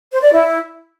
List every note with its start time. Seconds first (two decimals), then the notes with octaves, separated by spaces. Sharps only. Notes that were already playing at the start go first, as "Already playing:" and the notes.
0.12 C5
0.22 D5
0.32 E4